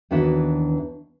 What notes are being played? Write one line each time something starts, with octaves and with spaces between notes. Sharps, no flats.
D#2 E3 B3 D4 F#4 E5